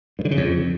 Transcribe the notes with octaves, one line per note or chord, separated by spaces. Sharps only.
G2
D3
C#3
F2